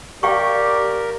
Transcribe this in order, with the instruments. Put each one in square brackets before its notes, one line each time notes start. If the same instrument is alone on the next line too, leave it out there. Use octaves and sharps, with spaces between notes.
[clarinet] G4 [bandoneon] A#4 [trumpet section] D5 [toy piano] F5 G5 C#6